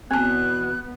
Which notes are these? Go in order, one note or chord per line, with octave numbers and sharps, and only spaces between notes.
E2 B2 B3 C4 A5 F#6